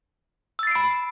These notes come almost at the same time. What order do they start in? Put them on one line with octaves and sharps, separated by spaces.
E6 A6 C7 D7 B5